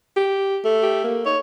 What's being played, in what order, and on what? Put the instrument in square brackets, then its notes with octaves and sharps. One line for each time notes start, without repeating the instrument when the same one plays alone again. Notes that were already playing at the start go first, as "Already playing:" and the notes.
[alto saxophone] G4
[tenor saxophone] A3
[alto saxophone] G4
A#3
[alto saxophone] D#4 [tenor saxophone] C#5